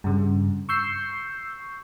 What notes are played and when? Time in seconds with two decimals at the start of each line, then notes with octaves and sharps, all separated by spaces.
0.04 G2 C#3
0.69 C#6 E6 G6 C7